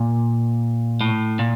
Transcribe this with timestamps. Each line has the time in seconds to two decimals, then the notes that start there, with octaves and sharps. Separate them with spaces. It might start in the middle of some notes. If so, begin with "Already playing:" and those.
Already playing: A#2
1.01 A2
1.39 A#2